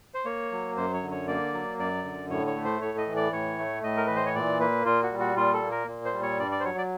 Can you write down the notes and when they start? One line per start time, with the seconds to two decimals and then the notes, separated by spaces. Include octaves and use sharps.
0.14 C5
0.25 A#3 C#5
0.52 F#3
0.77 F#2 C5
0.93 C#5
1.03 D3
1.11 C#5
1.28 A#3 D5
1.53 F#3
1.79 F#2 D5
2.04 D3
2.30 A2 C#5
2.47 C#5
2.56 A3
2.65 C5
2.81 A2 C#5
2.98 D#5
3.07 E3
3.16 D5
3.33 A2 C#5
3.59 A3
3.84 A2 D#5
3.97 A#4
4.07 E3 B4
4.16 C5
4.26 C#5
4.35 A#2 D5
4.60 A#3 B4
4.85 A#2 F4
5.03 F#4
5.12 G3
5.20 F#4
5.37 A#2 F4
5.54 A4
5.63 A#3
5.71 A#4
5.88 A#2
6.05 C5
6.13 G3
6.23 C#5
6.39 G2 D5
6.51 D5
6.60 C5
6.64 F#3 C#5
6.78 D5